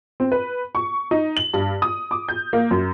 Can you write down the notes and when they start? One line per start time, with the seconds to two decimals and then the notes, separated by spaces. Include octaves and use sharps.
0.20 C4
0.32 B4
0.75 C#6
1.11 D#4
1.37 F#7
1.54 G2
1.82 D#6
2.11 D6
2.28 G6
2.53 A#3
2.71 F#2